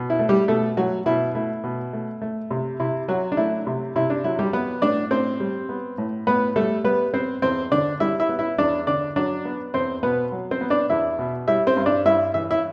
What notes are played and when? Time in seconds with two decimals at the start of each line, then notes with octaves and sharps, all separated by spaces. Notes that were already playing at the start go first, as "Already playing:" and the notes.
Already playing: B2
0.10 E4
0.19 A3
0.29 G3 G4
0.48 B2 A3 A4
0.77 F#3 A3 F#4
1.06 B2 E4
1.35 A3 E4
1.64 B2
1.93 A3
2.22 A3
2.51 C3
2.80 C3 E4
3.08 F#3 F#4
3.32 D4
3.37 A3 E4
3.67 C3
3.96 C3 E4
4.10 D4
4.24 F#3 E4
4.39 G3 G4
4.53 B3 B4
4.82 A2 D4 D5
5.11 A2 C4 C5
5.40 G3
5.69 B3
5.98 A2
6.27 A2 B3 B4
6.56 G3 A3 A4
6.84 G3 B3 B4
7.14 B3 C4 C5
7.42 E2 C4 C5
7.72 D3 D4 D5
8.00 G3 E4 E5
8.20 E4 E5
8.29 B3
8.39 E4 E5
8.58 E2 D4 D5
8.87 D3 D4 D5
9.16 F#3 D4 D5
9.45 B3
9.74 E2 C4 C5
10.03 B2 B3 B4
10.32 F#3
10.51 C4 C5
10.61 B3
10.70 D4 D5
10.90 E2 E4 E5
11.19 B2
11.48 G3 E4 E5
11.67 C4 C5
11.77 G2
11.86 D4 D5
12.06 G2 E4 E5
12.34 E3 E5
12.51 E4 E5